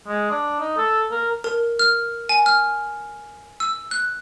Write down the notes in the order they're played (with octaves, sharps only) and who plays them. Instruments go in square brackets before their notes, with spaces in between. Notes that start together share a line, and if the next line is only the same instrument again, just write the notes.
[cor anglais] G#3
D4
D#4
A4
A#4
[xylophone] A#4
F6
G#5
F6
E6
F#6